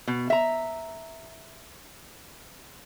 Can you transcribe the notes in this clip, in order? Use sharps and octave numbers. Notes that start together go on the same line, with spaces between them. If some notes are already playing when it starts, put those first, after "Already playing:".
B2
E5 A#5